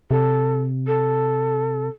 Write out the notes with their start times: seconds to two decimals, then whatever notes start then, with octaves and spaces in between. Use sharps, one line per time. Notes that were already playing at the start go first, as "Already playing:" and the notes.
0.11 C3 A4
0.87 A4